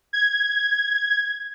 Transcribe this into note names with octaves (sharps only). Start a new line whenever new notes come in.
G#6